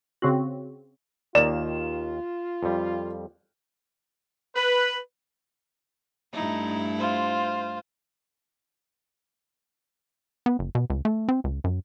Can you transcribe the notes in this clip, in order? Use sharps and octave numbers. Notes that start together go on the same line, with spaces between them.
C#3 C4 F#4
D#2 D#3 A#3 F4 D5 E7
F2 G3
B4
G2 A3 D#4 E4
F4 C5
B3
F#1
B2
C#2
A3
C4
C#2
F#2